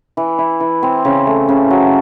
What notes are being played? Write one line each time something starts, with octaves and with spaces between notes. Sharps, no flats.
E3
E4
E3
C4
C#3
A3
C#3
F#3